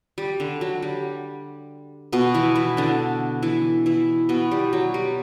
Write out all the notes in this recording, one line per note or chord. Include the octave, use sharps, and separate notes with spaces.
G3
D3
F#3
G3
B2 B3
E3 E4
E3 E4
D3 D4
E3 E4
E3 E4
B2 B3
G3
F#3
G3